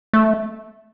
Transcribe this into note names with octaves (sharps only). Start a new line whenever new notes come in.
A3